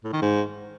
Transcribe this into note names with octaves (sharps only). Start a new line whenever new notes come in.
A2
D#3
G#2